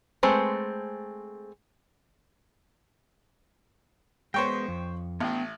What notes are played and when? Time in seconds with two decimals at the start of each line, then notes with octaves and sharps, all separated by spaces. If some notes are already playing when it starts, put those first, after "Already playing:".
0.23 G#3 A3 C4 B4 C5
4.34 G#3 B3 C5 C#5 G5
4.68 F2
5.20 A1 B3 G5